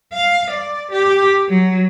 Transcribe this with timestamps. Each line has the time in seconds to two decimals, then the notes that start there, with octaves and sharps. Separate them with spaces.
0.13 F5
0.50 D5
0.91 G4
1.49 F#3